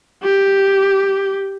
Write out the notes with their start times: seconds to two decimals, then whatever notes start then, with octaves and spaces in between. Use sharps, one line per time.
0.24 G4